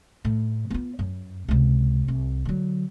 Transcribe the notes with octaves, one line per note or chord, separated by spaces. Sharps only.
A2
B3 F4
F#2
C#2 C3
C2
D3 F#3